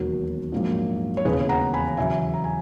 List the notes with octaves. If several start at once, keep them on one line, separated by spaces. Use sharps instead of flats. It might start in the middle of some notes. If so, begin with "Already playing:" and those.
Already playing: E1 D#2 D#3 F#3 B3 F#4 A#4
A#1 G#2 F#3 A#3
C#5
E1 D#2 C#3 E3 G#4 B4
F#5 A#5
G#5 B5
E2 C#3 F#3 E5 G#5
A#5
G#5